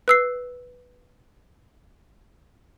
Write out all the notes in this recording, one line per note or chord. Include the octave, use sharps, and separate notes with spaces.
B4 E6 C7